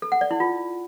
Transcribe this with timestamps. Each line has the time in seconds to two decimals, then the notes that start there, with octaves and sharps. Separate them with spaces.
0.02 A4
0.12 F#5
0.21 D5
0.31 E4
0.40 F4